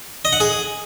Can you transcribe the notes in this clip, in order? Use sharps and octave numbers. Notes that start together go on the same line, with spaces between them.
D#5
F#5
G#4